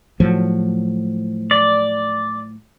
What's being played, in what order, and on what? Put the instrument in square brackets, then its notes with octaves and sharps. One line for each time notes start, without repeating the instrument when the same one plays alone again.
[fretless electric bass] A2 F3 F#3
[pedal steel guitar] D5